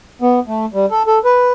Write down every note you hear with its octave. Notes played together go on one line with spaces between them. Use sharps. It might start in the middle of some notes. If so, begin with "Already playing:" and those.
B3
A3
G3
A4
A4
B4